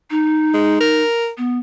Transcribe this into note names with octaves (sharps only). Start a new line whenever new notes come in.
D#4
G#3
A#4
B3